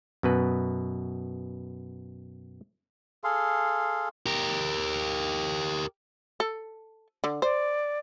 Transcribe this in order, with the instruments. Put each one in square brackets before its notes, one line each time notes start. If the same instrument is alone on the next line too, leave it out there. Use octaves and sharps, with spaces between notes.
[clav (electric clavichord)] F#2 B2 B4
[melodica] G#4 A4 F5 C6
[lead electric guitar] G4 A#4
[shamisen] A4
D3
[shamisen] C5 [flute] D5